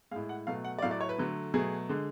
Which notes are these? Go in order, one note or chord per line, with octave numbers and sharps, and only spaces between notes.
A2 G#3 F5
F#5
B2 F#3 A3 F5
F#5
D5
A2 F#3 A3 F5
D5
C#5
B4
D3 F#3 A3
B2 F#3 A3 G#4
D3 G#3